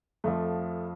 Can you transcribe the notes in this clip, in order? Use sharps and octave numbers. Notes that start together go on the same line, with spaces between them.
F2 F3 A3